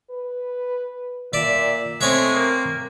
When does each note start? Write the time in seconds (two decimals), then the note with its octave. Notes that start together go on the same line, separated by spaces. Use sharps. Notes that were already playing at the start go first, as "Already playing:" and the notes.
0.11 B4
1.33 A#2 D5 E5
2.01 G#3 A3 C4 C#5 E5
2.35 A#3 A#4